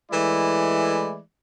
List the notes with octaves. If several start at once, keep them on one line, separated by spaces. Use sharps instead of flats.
E3 G#3 A3 E4 D5